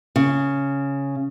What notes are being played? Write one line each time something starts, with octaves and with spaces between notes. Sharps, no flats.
C#3